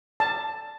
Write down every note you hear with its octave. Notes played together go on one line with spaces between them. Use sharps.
A5